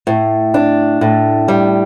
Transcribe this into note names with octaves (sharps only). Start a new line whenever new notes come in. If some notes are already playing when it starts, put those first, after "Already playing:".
A2
D4
A2
G3